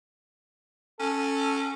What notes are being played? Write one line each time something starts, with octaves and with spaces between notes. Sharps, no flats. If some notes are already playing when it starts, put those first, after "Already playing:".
C#4 A4